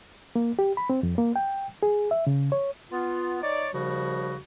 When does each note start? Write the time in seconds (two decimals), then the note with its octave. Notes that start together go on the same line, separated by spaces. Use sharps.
0.36 A#3
0.59 G4
0.77 B5
0.90 C4
1.03 F2
1.18 A#3
1.36 G5
1.83 G#4
2.11 E5
2.27 C#3
2.52 C#5
2.91 B3 F4
3.42 D#4 C#5 D5
3.73 D#2 C#3 F3 G3 F#4